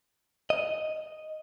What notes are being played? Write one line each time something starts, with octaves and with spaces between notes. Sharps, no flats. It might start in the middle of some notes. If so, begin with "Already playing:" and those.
D#5